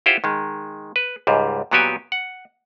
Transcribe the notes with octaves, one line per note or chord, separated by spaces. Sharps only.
E4 F4 G4 C5 F#5
D#3 G#3
B4
C#2 G#2 G3
A#2 F#3 B3 F#4 G4 G#5
F#5